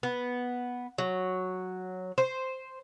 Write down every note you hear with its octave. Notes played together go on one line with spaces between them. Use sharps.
B3
F#3
C5